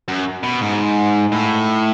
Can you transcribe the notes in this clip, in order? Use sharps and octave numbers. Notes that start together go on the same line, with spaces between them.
F#2
B2
G#2
A2